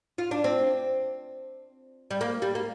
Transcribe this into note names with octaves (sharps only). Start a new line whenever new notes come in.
F4
D4
C4
G3
A#3
G3
A#3